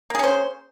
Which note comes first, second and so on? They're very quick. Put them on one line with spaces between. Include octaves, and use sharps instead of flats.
A#3 G#4 C#4 C5